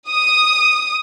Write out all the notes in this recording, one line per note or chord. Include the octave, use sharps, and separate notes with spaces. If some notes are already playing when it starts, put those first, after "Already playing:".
D#6